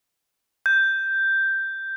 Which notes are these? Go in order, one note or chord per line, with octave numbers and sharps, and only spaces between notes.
G6